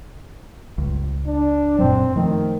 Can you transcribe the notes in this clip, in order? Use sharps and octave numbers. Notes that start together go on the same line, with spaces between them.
C#2 G2
D4
F#2 A#2 F#3 C4
D#3 F3 A3